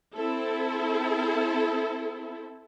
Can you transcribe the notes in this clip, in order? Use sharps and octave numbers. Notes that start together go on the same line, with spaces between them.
C4 E4 A4